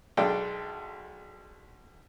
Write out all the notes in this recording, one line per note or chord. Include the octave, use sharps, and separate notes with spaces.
B1 G#3 D4 A4 G5